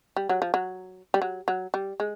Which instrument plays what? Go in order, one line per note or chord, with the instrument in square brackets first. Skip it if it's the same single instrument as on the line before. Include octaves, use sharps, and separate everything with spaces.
[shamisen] G3
F#3
F3
F#3
G3
F#3
F#3
G3
G#3